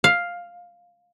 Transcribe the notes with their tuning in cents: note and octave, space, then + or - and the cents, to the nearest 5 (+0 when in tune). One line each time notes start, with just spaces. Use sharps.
F5 +5